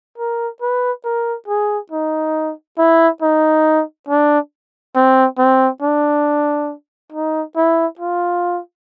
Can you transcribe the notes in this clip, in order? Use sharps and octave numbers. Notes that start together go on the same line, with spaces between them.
A#4
B4
A#4
G#4
D#4
E4
D#4
D4
C4
C4
D4
D#4
E4
F4